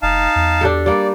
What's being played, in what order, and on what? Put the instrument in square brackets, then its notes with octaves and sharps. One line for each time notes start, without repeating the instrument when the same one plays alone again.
[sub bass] F1 [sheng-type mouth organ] D#4 F5 A5
[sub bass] E2
[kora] D4 G4 A4
[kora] G3 A#3 [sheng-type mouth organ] D5